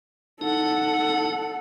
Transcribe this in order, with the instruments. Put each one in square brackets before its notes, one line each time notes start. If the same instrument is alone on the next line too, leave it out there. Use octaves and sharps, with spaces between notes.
[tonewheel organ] D#4 [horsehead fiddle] A4 F#5